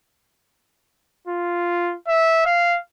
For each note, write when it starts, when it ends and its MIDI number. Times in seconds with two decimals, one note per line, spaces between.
1.28 1.95 65
2.08 2.45 76
2.46 2.78 77